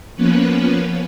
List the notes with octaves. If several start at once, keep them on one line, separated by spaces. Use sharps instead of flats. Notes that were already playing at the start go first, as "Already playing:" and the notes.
F3 A#3 B3 C#4 B4